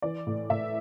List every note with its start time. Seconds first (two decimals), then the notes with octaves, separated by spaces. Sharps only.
0.02 E3 D5
0.27 A2
0.50 A2 E5